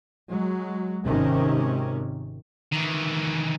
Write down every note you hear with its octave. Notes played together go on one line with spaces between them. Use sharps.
F#3 G#3
G#1 C3 D#3 C#4
D#3 E3